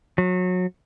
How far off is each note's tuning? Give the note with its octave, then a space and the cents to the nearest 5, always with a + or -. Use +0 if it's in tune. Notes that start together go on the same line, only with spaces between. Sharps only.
F#3 -25